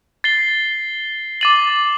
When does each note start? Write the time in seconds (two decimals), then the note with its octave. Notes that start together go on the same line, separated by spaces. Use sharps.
0.24 A6 C7 G7
1.41 D6 A6 D#7 F#7